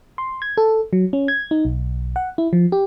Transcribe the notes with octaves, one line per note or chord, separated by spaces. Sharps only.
C6
G#6
A4
F#3
C#4
G#6
D#4
B1
F#5
E4
F3
G4